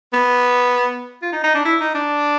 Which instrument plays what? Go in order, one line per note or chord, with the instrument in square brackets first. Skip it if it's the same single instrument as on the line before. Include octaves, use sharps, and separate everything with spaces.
[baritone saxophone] B3
F4
D#4
D#4
D4
E4
D#4
D4